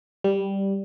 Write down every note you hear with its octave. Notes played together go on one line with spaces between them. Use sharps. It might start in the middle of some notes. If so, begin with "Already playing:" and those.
G3